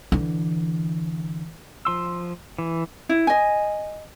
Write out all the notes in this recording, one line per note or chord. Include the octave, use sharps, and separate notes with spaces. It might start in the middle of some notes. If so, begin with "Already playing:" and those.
D3 E3
F3 C6 E6
E3
E4
D#5 G#5